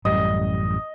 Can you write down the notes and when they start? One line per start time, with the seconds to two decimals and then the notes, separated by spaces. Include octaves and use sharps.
0.05 A1 F#2 G3 D#5